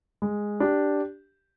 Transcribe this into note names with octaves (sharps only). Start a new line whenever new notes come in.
G#3
D4 G4